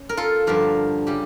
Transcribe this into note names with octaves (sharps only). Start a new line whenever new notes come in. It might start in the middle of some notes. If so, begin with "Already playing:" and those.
Already playing: C#4
A#4
F4 A4
G2 D3 F3 G4 A#4
C#3 G3 G4